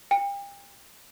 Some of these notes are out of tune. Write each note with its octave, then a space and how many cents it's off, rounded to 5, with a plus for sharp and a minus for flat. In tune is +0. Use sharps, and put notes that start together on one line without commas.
G5 +35